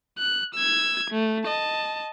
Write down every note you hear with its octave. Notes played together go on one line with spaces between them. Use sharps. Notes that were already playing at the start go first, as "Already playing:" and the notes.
F#6
E6 G#6
A3
D#5 A5